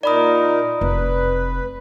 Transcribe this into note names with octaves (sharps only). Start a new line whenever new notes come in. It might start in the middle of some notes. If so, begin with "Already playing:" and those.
A#2 D#4 A#4 D5 B5 D#6
F1 B4